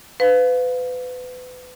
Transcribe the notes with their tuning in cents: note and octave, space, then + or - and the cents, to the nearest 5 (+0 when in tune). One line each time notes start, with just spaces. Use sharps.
B4 +30 F5 +20